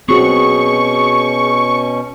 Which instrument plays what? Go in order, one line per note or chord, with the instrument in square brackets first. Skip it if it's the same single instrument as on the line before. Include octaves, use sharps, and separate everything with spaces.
[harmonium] B2 C#4 [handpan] C4 F#4 [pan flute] G#4 [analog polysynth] C#6